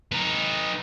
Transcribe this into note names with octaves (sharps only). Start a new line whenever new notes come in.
D#4 B4